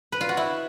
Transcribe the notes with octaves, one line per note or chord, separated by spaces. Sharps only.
B4
F4
F#4
E4